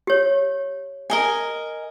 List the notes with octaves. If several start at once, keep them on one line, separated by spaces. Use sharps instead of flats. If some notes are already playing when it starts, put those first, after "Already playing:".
G4 C#5
A#4 D#5 G#5